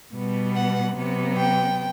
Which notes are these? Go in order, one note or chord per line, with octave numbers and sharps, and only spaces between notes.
B2 G3 B3
F#5
C3 F#3 B3
G5